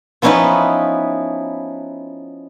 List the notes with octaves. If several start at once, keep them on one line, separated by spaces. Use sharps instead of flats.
F3 B3 C#4 D#4 E4 B4